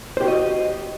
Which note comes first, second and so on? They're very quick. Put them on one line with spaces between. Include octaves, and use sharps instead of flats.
C5 G4 F#4 D#5